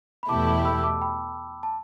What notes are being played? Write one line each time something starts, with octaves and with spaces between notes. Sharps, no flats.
B5
E2 B2 A3 E4 G4 A5 D6
A5 D6
B5 E6
E6
A5 D6
G5 B5
A5